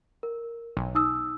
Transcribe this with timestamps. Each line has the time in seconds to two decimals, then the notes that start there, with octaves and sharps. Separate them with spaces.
0.23 A#4
0.77 B1
0.95 D#4 D#6 E6